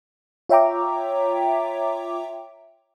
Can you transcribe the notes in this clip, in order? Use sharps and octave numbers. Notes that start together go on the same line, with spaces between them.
F4 C#5 E5 G5 A#5 D6